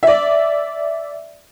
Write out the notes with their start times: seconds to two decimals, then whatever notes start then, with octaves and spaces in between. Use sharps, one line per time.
0.03 D5 E5